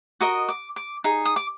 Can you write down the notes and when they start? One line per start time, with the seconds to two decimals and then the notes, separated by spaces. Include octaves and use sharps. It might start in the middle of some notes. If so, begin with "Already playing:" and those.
0.21 F#4 A#4 D#5 D#6
0.49 D6
0.76 D6
1.04 D#4 G#4
1.25 D#6
1.36 D6